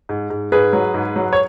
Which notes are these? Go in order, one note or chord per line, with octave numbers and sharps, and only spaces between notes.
G#2
G#2
G#2 G#4 B4
F#3
G#2
F#3
C#5